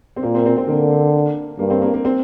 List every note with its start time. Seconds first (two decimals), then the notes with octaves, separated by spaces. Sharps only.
0.16 C4
0.22 A#2 A#3
0.34 C4
0.46 C4
0.57 C4
0.68 D3 A#3
1.59 G2 A#3
1.70 C4
1.82 A#3
1.94 A#3
2.05 C4